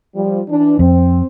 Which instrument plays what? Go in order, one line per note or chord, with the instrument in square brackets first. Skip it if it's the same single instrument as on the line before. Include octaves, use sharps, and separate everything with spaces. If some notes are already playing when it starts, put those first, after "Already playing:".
[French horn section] F3 G3
E3 D4
[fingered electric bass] F2 [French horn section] C4